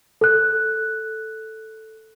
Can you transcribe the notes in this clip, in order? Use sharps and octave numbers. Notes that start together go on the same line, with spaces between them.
A4 F#6